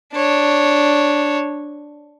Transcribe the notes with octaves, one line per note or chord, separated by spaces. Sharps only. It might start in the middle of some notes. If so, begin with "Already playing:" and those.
D4 C#5